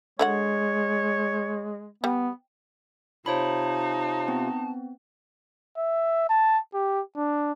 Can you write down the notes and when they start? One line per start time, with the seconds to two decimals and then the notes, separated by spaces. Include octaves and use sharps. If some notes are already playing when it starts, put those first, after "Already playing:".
0.19 D3 G#3 F#4 C#5 F#5
2.04 G3 B3
3.26 C3 D#4 F4 C5 C#5 A5 B5
4.28 B3 C4
5.78 E5
6.29 A5
6.74 G4
7.16 D4